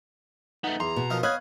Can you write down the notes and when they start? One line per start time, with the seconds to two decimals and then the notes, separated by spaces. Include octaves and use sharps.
0.64 A3 B3 D#4
0.80 E2 A#5 C6
0.96 B2
1.10 F3 D#4 A#4
1.23 C#5 D#5 F5 B5 D#6 F#6 G#6